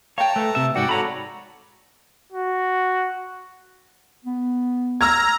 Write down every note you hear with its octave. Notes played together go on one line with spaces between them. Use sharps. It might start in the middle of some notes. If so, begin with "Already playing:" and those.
C#5 F5 G5 A5 A#5
A3 B4
C3 E5
G#2 F#4 D5 F#5 G5
F#4 A4 C#5 A#5 B5
F#4
B3
A#5 E6 F6 G#6